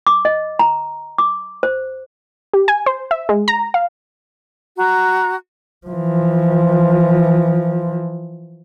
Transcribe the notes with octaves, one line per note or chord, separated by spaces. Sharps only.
D6
D#5
A#5
D6
C5
G4
G#5
C5
E5
G#3
A#5
F5
F#4 A#5
E3 F3